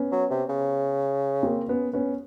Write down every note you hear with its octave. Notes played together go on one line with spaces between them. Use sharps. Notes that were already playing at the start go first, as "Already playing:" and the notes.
Already playing: B3 C#4
F#3
C3
C#3
A#3 C4
B3 C#4
B3 C#4